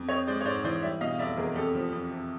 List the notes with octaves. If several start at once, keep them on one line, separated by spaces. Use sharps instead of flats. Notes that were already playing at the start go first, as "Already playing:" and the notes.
Already playing: F2
C4 C#5 D#5
G#3 C5 D5
C#5
G#2 C5 D5
E3 C5 D5
G3 D5 E5
B2 D#5 F5
F5
F1 D5 E5
E2 G#4 A#4
F2 G4 A4
F3
F2
C3